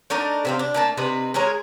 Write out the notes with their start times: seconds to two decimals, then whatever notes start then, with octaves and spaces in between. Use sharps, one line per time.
0.10 A3 D4 D#4 A#4
0.45 C3 C4 F5
0.59 D4
0.74 A3 A#3 A5
0.97 C3 D#4 B4
1.34 G#3 G#4 A#4 C#5